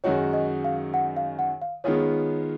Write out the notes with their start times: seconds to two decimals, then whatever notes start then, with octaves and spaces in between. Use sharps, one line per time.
0.04 F#2 D#3 G#3 D#4 F#4 C#5
0.33 D#5
0.64 F5
0.94 F#5
1.17 F5
1.39 F#5
1.62 F5
1.84 D#3 G#3 B3 F4 G#4 C#5